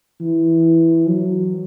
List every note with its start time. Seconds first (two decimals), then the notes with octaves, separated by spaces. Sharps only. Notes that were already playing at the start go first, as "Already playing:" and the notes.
0.21 E3
1.08 F#3